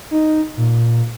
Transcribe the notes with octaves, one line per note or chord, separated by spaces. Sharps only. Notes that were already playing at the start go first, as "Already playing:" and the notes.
D#4
A#2